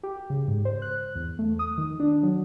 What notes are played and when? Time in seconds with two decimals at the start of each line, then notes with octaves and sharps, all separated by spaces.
0.03 G4
0.30 C#3
0.48 G#2
0.65 C5
0.82 F#6
1.15 E2
1.39 A3
1.59 D#6
1.78 D#3
2.00 D4
2.23 F#3